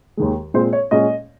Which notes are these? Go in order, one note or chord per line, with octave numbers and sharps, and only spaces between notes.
D#2 D#3 G#3
A#2 G#3 C4 C5
C#5
A#2 G#3 C#4 D#5